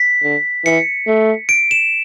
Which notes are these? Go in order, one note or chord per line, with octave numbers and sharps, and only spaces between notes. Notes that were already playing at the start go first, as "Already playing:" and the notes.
Already playing: B6
D3
E3 C#7
A3
D7
E7